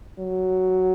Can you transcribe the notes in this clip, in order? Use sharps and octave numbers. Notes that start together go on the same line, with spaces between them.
F#3